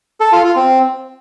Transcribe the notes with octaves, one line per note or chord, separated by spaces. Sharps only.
A4
F4
F4
C4